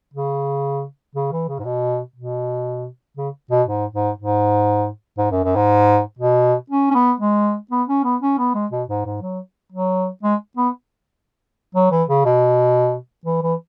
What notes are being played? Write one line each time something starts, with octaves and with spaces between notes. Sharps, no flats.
C#3
C#3
E3
C#3
G#2
B2
B2
C#3
B2
G#2
G#2
G#2
G#2
F#2
F#2
G#2
B2
C#4
C#4
B3
G#3
B3
C#4
B3
C#4
B3
G#3
B2
G#2
G#2
F#3
F#3
G#3
B3
F#3
E3
C#3
B2
E3
E3